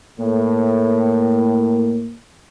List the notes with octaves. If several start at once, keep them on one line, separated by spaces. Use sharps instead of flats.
A2 A#3